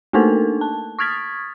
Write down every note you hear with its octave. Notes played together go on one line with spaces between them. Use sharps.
A3 A#3 D4 D#4 A4 A#4
A5
C#6 D#6 F6 G#6 A6 B6